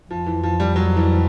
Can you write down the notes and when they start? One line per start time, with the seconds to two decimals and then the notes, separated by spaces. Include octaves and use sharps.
0.11 F2 F3
0.26 E3
0.43 F3
0.60 G3
0.76 F#3
0.97 E3